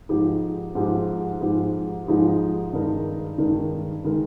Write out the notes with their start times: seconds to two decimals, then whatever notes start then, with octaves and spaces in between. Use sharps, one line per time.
0.09 G#2 F3 G#3 D#4 G4
0.75 G#2 F3 G#3 D#4 G4
1.41 G#2 F3 G#3 D#4 G4
2.07 G#2 F3 G#3 D#4 G4
2.73 G2 D#3 G#3 D#4 A#4
3.38 G2 D#3 G#3 D#4 A#4
4.04 D#3 G#3 D#4 A#4